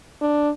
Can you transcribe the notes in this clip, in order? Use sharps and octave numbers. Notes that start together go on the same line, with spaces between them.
D4